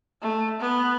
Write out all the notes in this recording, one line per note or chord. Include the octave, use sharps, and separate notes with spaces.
A3
B3